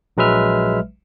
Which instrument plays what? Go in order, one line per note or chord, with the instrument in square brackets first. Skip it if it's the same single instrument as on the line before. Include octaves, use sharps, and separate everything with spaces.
[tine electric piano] A#1 F#3 G#3 B4 E5 F6